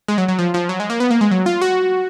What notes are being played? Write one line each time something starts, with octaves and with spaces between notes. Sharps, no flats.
G#3
F#3
F#3
F3
F3
F#3
G#3
A#3
B3
A#3
G#3
F#3
F4
F#4